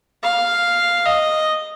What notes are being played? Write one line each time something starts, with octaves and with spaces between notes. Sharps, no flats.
F5
D#5